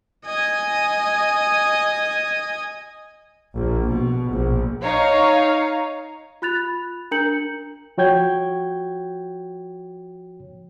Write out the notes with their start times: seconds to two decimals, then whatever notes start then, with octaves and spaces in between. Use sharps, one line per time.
0.26 D#5 G#5
3.55 A#1
3.91 B2
4.31 A#1
4.82 D#4 C#5 F5 A#5
6.42 F4 B5 F#6 A6 F7
7.11 D4 A#4 A#5 G6 C#7 F#7
7.98 F3 F#4 C#5 G5 G6 G#6